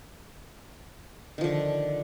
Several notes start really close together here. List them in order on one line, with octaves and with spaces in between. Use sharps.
D#3 F3 D3